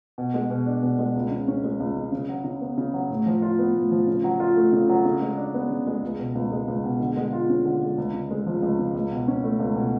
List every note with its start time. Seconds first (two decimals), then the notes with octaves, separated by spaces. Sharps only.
0.18 B2
0.34 G#3
0.50 B2
0.66 D4
0.83 B2
0.99 G#3
1.16 C#2
1.32 C#3
1.48 C#4
1.64 G#3
1.80 C#2
1.97 C#3
2.12 C#3
2.29 F#3
2.44 C#3
2.61 B3
2.78 C#3
2.94 F#3
3.10 A2
3.27 F3
3.42 F4
3.59 B3
3.75 A2
3.92 F3
4.08 C#3
4.24 F#3
4.40 F4
4.56 A3
4.73 C#3
4.89 F#3
5.05 C#3
5.21 G#3
5.37 D4
5.54 B3
5.70 C#3
5.87 G#3
6.03 C#2
6.19 B2
6.35 C#2
6.52 G#3
6.68 C#2
6.84 B2
7.00 D3
7.17 G#3
7.33 F4
7.49 C#4
7.66 D3
7.82 G#3
7.98 C#2
8.14 C#3
8.31 G#3
8.47 F3
8.62 C#2
8.79 C#3
8.95 C#2
9.11 B2
9.28 C#4
9.44 A3
9.59 C#2
9.76 B2